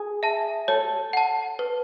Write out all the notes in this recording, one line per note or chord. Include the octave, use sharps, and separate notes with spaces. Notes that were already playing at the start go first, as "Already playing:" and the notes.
Already playing: G#4
E5 A5
A4 C#5
F#5 A5
B4